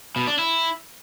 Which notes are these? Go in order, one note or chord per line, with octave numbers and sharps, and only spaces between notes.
B2
D4
E4